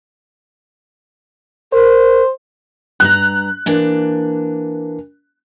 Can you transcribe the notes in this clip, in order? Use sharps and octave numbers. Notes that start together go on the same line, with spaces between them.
A#4 C5
G2 A#5 F#6
E3 A#3 D4